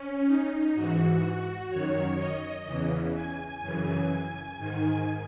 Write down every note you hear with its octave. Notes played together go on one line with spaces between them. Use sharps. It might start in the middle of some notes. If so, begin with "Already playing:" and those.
Already playing: C#4
D#4
G#2 E3 F#4
F#4
F#2 D#3 C#5
D#5
E2 C#3 E3
G#5
F#2 C#3 E3
G#2 D#3 G#5